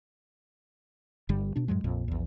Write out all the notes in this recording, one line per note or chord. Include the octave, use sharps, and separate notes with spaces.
G1 G2 D3 G3
B2 D4
F#2 A2 F#3 G#3
A#1 F2 A#2
A#1 E2